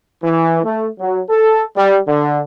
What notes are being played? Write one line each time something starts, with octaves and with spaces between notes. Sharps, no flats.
E3
A3
F#3
A4
G3
D3